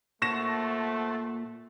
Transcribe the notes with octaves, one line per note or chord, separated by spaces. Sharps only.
A#2 A3 C5 F#5 A5 C#6 A#6 E7